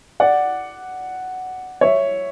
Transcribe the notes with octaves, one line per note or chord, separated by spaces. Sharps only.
D5 F#5
C#5 E5